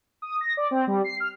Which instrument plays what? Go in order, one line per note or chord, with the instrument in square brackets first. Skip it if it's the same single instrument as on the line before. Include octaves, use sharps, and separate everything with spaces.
[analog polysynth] D#6
A#6
D5
C4
G3
C7
F6